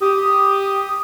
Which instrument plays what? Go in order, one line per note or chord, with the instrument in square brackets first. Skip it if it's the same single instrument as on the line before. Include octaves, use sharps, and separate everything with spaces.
[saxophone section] G4 [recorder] D#6